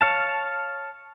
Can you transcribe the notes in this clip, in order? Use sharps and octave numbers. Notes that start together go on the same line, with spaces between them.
C#5 F5 A5